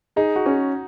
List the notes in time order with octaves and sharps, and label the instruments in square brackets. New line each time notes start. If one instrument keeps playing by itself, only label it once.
[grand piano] D#4 [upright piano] G#4
[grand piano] F#4
[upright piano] C#4